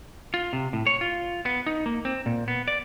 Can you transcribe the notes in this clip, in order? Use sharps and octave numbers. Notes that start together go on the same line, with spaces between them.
F4
C3
A2
C#5
F4
B3
D#4
A#3
C4
A#2
B3
D5